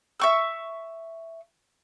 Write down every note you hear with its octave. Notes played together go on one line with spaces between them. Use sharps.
E5 C#6 E6